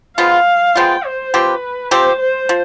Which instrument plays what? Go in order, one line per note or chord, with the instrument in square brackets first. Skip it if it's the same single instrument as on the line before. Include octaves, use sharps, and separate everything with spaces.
[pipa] F3 G#3 B3 F4 [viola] F5
[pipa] F3 G#3 B3 F4 [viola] G5
[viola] C5
[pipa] F3 C4 G4 [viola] B4
[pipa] F3 C4 G4 [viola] C5
[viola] C5
[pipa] F3